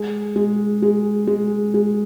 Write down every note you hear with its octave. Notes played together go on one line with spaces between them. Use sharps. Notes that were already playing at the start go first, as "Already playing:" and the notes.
Already playing: G#3
G#3
G#3
G#3
G#3